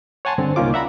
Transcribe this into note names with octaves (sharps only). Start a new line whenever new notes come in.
C#5 F#5 G#5 A5 C6
G2 D3 C4
C2 A#3 C#4 D#4 F4 D6
D5 E5 F#5 A#5 B5